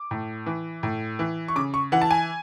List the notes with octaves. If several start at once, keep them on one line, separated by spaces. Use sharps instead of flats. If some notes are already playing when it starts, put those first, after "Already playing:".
Already playing: D6
A2
E3
A2
E3
C#6
C#3 D6
C#6
E3 F#5
A5
G#5